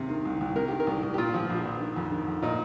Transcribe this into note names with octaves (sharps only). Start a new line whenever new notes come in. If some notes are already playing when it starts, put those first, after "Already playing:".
Already playing: D#2 C3
D#3
C2
C2
C3 A#4
D#3 G4
A#4
C2
C2
G4
A#2 F4
F3
A#1
A#1
D#3
F2
D#3
F2
A#2 D#4